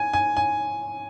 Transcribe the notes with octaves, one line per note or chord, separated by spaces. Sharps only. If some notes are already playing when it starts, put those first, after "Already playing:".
Already playing: G#5
G#5
G#5